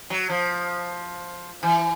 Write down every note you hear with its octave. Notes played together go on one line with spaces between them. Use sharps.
F#3
F3
E3